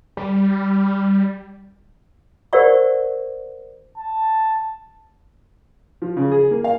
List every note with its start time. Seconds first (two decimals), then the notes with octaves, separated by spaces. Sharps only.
0.17 G3
2.53 G4 A#4 C5 D5 F#5 C#6
3.98 A5
6.02 F3
6.17 C#3
6.31 G#4
6.51 A#3
6.64 F5